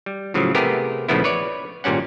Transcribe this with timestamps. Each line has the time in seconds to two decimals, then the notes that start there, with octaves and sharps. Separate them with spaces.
0.06 G3
0.34 A2 C#3 F3 F#3
0.55 C3 A3 B3 G4 G#4 A#4
1.08 A#1 C#3 F3 A3 B3 E4
1.24 B4 C#5 D5
1.84 G#1 A#2 G3 C#4 F#5